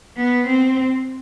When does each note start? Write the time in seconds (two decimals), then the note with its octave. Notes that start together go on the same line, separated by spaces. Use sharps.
0.17 B3
0.47 C4